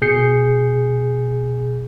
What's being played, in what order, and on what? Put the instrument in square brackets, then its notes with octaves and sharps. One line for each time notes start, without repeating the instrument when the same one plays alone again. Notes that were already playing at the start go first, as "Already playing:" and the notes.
[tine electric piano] B2 G#4 G6 C7 C#7